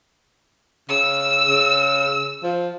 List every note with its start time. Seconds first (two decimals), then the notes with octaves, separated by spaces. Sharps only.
0.89 C#3 E6
1.49 C#3
2.44 F3